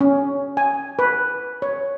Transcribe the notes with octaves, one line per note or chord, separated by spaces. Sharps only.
C#4
G#5
B4
C#5